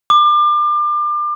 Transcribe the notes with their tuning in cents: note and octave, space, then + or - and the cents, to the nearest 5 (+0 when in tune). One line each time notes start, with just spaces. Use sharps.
D6 +30